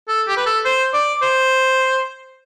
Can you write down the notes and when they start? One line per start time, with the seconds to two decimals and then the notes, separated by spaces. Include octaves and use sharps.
0.08 A4
0.27 G4
0.37 B4
0.46 A4
0.65 C5
0.94 D5
1.22 C5